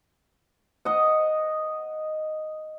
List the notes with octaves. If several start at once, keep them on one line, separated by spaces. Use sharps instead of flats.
D#5 F#5